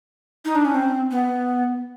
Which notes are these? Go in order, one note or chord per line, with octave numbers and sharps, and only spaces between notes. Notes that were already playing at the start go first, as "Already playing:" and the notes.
D#4
D4
C#4
C4
B3